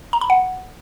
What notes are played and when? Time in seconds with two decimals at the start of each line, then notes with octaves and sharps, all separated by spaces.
0.13 A#5
0.21 B5
0.30 F#5